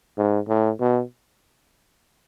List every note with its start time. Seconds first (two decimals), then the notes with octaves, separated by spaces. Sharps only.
0.17 G#2
0.48 A2
0.80 B2